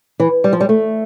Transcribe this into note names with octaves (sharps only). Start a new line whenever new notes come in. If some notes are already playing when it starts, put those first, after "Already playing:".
E3
G3
F3
G3
A3